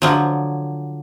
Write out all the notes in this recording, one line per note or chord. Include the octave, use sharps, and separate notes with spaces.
D3 F3 F#3